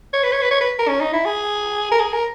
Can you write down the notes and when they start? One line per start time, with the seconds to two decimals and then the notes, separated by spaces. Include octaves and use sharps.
0.13 C#5
0.23 B4
0.32 C#5
0.41 B4
0.51 C#5
0.60 B4
0.79 A#4
0.88 C#4
1.00 D#4
1.13 E4
1.25 G#4
1.91 A#4
1.99 G#4
2.13 A#4